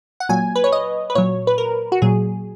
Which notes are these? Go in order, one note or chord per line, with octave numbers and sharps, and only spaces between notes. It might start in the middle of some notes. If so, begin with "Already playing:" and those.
F#5
A#2 F#3 G#5
B4
C#5
D#5
B4
A#2 F#3 C#5
B4
A#4
F#4
A#2 F#3 G#4